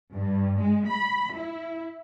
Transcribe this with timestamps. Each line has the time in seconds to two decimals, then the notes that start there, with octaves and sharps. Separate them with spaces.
0.14 G2
0.60 G#3
0.89 B5
1.35 E4